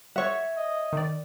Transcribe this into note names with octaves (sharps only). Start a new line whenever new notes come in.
C#5 E5 F#5 C#6
D#5
D#3 D5